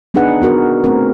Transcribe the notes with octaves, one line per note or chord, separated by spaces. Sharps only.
B3 D4 D#4 G#4 B4 F#5
B3 F#4 A#4
A3 B3 C4 A#4